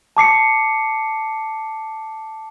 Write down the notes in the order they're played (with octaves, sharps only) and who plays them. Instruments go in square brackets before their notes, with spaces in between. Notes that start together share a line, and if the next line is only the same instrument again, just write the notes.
[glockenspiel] A5 D6 C7 C#7